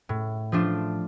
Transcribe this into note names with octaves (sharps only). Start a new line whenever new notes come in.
A2
F3 A3 D4 F4